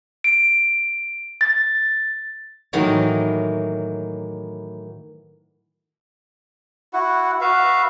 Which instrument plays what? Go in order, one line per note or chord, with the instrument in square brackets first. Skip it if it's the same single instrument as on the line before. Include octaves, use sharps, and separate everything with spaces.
[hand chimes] D7
A6
[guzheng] A2 D#3 E3 F#3 A#3 D#4
[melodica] E4 F#4 F#5
F#4 B4 E5 F5